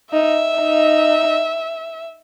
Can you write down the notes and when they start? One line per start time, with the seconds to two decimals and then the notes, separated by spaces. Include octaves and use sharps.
0.13 D#4 E5
0.58 D#4